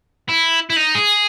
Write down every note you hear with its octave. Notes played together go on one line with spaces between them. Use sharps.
E4
E4
D#4
G#4